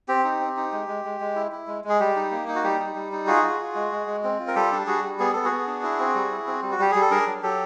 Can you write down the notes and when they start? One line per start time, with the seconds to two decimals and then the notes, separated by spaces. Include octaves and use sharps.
0.08 C4 G4
0.24 D#4
0.40 C4
0.57 D#4
0.72 G#3
0.88 G#3
1.05 G#3
1.20 G#3
1.36 E4
1.52 E4
1.68 G#3
1.84 G#3
1.89 G#4
2.00 G3 G4
2.16 D#4
2.31 A#3
2.48 D#4
2.55 F#4
2.64 G3 G4
2.80 D#4
2.95 G3
3.12 D#4
3.27 F4 F#4 G#4
3.43 F4
3.60 F4
3.75 G#3
3.92 G#3
4.07 G#3
4.24 C4
4.40 F4
4.48 A#4
4.55 G3 G4 A4
4.72 D4
4.87 G3 F#4 G#4
5.03 G3
5.19 B3 G#4
5.33 B3 A4
5.45 F#4 G#4
5.52 B3
5.67 D4
5.83 E4
5.99 C4
6.15 G3
6.31 E4
6.47 C4
6.63 G3
6.71 F#4
6.79 G3 G4
6.92 G3 G#4
7.01 A4
7.11 D4 G#4 A#4
7.27 F#3
7.42 F#3 G4 A4